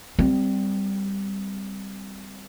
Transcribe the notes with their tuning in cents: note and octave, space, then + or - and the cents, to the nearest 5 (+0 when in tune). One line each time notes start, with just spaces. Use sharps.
G3 +5 C4 -10